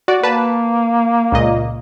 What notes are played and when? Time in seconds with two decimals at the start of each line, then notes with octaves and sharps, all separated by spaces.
0.08 F#4 D5
0.23 A#3 B4 A5
1.32 C#2 A#2 D#5